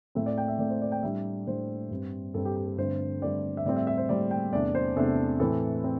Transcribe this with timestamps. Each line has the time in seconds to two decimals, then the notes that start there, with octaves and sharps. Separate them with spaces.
0.15 A2 A3 C4 E5
0.26 D5
0.38 G5
0.48 E5
0.59 A2 A3 C4 D5
0.70 C5
0.82 D5
0.92 G5
1.03 A2 G3 D4 E5
1.47 A2 G3 D4 C5
1.91 G2 G3 C4
2.34 G2 G3 C4 A4
2.45 G4
2.56 G4
2.66 A4
2.78 G2 D3 A3 C4 C5
3.22 G2 D3 A3 C4 D5
3.57 E5
3.66 A2 G3 C4 D5
3.76 E5
3.87 E5
3.98 C5
4.09 A2 G3 C4 D5
4.31 G5
4.53 E2 C3 A3 D4 D5
4.75 C5
4.96 E2 C3 A3 D4 A4
5.40 A2 E3 C4 A4
5.84 C4